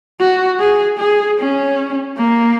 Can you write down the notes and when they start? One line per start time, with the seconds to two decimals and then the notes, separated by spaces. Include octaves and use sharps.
0.20 F#4
0.60 G#4
0.99 G#4
1.38 C#4
2.18 A#3